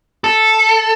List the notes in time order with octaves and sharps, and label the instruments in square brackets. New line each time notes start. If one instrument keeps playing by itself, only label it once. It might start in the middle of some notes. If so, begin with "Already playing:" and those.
[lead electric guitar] A4